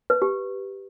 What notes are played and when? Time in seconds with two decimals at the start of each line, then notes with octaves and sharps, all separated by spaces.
0.10 B4
0.22 G4